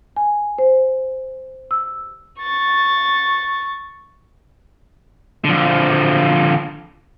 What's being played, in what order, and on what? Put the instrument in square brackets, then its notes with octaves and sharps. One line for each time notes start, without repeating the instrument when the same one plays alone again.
[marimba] G#5
C5
E6
[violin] C#6 A6
[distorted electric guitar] D3 F3